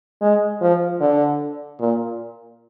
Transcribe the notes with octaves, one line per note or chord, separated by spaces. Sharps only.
G#3
F3
D3
A#2